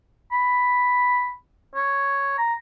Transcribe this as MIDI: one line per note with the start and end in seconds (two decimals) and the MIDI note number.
0.32 1.32 83
1.75 2.35 73
2.38 2.54 82